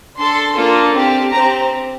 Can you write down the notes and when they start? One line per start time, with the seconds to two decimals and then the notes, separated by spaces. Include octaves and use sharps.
0.18 D4 A4 C6
0.56 A#3 D4 F4 A4
0.94 C4 G4
1.32 C4 G4 A#5